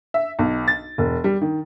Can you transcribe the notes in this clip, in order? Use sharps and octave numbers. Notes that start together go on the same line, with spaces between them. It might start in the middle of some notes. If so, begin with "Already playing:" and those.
E5
B1
A6
E1
G3
D#3